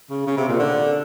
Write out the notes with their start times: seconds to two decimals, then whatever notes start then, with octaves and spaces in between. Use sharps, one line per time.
0.10 C#3
0.27 C#3
0.37 C3
0.49 A#2
0.59 D3